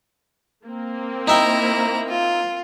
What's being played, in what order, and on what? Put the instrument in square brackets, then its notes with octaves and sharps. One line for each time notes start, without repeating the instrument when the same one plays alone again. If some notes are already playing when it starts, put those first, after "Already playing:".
[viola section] A#3 C4
[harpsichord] D#4 E5 G5 [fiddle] E4 A#5
[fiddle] F4